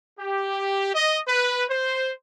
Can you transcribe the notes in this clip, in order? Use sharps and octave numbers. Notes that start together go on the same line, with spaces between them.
G4
D#5
B4
C5